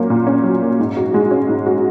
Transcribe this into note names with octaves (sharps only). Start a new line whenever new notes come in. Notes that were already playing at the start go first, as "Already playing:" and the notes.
Already playing: A#2 F#3 A#3 C#4
A#2
C#4
F#3
A#3
G#2
F#4
G#3
C#4
G#2
F#4